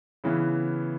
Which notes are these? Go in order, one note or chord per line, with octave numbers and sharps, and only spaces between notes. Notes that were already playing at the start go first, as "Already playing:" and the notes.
C#3 E3 B3 E4